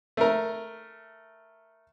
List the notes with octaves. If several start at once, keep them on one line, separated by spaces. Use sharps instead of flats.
A3 A#4